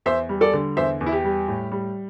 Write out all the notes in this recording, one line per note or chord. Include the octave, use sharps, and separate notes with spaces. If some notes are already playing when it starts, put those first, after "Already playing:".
E2 C5 E5
G3
A4 D5
D3
E2 C5 E5
E2
E4
G4
G3
A2
G3